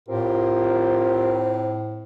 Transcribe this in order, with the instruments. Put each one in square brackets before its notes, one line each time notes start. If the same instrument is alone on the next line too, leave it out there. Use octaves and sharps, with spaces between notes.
[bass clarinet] A2 [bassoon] C4 [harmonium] F4 G4 A#4